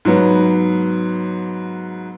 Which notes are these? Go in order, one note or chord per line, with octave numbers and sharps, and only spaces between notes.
G#2 F#3 B3